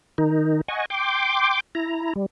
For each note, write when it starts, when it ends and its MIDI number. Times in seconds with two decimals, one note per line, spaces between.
0.18 0.61 51
0.18 0.61 63
0.68 0.85 75
0.68 0.85 78
0.68 0.85 80
0.68 0.85 85
0.90 1.60 79
0.90 1.60 84
0.90 1.60 86
1.75 2.13 64
1.75 2.13 82
2.16 2.26 55